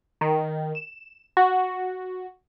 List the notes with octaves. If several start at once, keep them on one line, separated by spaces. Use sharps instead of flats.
D#3
E7
F#4